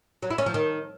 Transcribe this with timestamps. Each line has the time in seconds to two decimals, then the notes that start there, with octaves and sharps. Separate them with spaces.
0.22 F#3
0.30 E4
0.38 C#4
0.46 F3
0.54 D#3